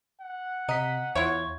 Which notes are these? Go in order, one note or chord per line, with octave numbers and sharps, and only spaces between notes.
F#5
C3 D#5 A#5 B6
E2 E4 F4 C#5 E5 G#6